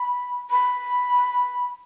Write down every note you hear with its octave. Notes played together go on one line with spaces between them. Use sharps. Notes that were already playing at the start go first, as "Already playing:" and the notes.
Already playing: B5
B5